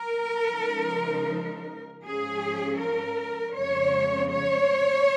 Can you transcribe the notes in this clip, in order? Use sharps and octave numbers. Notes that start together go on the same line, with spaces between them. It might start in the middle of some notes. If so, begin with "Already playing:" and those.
Already playing: A#4
C#3 F3 G#3 D#4
G#2 F3 C#4 G#4
A#4
F2 C#3 G#3 C#5
C#5